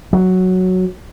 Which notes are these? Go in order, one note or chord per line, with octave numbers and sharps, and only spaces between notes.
F#3